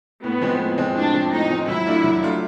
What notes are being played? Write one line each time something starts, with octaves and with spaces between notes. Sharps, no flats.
A2 B3
F3 G#3 C4
A2
F3 G#3 C4
A2 D4
F3 G#3 C4
A2 D#4
F3 G#3 C4
F#3 E4
A3 D4 F4
F#3
A3 D4 F4